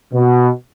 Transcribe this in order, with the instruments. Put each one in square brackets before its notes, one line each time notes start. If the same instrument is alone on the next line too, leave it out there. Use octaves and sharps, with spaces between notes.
[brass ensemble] B2